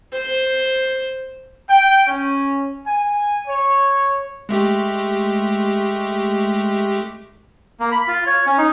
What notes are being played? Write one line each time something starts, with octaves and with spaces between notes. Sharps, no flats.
C5
G5
C#4
G#5
C#5
G#3 A3 G4
A#3
B5
F4
C#5
C#4
D#4